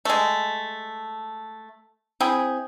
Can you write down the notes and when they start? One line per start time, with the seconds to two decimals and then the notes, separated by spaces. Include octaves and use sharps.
0.05 G#3 A3
2.20 C4 E4 G#4 G5